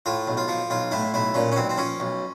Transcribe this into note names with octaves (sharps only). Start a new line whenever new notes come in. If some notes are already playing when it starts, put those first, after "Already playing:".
A2 F4
B1
F4
F3
B1 F4
A2 E4
B1 E4
A#2 C#4
C#4
B1 C4
C4
F3 C#4
B1